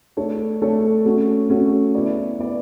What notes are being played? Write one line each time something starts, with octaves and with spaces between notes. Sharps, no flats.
A3 D4 A4 C#5
A3 D4 A4 C#5
A3 C#4 F#4
A3 C#4 F#4
B3 E4 B4 D5
B3 E4 B4 D5